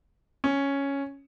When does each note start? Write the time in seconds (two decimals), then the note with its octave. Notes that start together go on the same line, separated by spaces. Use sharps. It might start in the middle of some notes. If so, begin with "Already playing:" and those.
0.44 C#4